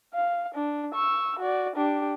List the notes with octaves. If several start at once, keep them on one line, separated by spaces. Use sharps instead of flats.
F5
D4
C#6 E6
F#4 D5
D4 G4